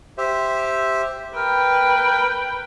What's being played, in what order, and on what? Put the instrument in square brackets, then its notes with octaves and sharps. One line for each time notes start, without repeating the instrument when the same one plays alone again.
[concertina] G4 C5 E5
[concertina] A#4 [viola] B4 G5